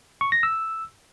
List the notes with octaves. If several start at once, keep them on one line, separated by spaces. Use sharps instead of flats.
C#6
A#6
E6